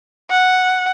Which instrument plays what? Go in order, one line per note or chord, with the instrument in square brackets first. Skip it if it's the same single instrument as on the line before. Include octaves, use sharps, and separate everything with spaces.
[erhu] F#5